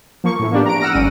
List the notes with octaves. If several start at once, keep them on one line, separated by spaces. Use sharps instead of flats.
F3 A#3 C#6
A2 E3
A#3 B3 D4 G4
A#5 D7
F#5 E6 F6 A#6 D7
G#1 G3 C#4 D#7